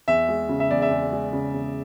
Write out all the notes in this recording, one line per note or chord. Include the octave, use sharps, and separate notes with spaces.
E2 E5
G#3
C#3
E5
E2 D5
E5
E2
G#3
C#3
E2